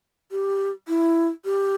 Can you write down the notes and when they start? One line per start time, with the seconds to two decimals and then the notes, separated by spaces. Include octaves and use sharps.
0.31 G4
0.88 E4
1.45 G4